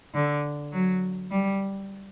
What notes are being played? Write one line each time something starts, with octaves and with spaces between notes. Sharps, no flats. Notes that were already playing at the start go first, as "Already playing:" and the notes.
D3
F#3
G3